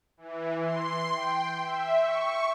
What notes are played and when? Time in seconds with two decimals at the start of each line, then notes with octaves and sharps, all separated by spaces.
0.17 E3
0.60 C6
1.12 G5
1.61 E5
1.99 C#6